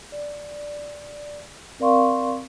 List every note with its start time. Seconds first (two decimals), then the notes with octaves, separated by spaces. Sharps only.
0.12 D5
1.80 C4 A#4 D5 F5 C6 C#6